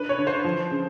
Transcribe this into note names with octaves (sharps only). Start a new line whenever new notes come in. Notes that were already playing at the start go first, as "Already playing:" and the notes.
Already playing: D4 B4
C#5
D3
C5
F3
C#3